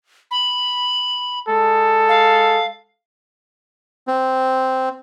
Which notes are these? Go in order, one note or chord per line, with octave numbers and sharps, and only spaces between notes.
B5
G#3 A4
F5
C4